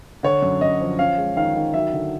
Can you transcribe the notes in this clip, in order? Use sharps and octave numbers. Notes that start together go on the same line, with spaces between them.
D3 C#5
F#2
F#2 D#5
F3
C#4 F5
G#3
D#3 F5
D#3
F#3 E5
D3